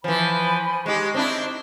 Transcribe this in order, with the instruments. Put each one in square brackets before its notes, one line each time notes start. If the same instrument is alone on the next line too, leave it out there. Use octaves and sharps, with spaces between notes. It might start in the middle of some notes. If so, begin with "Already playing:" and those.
[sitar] E3 F3 [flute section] C5 G#5 B5
[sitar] G#3 G4 [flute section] D#4 D#5 C#6
[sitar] C4 D4 E4